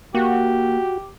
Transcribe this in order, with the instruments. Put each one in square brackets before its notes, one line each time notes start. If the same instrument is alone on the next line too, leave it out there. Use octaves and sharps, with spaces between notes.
[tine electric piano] A#3 [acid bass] F#4 [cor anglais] G4